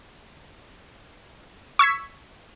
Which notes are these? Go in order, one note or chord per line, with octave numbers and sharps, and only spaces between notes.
C#6 E6 G#6 B6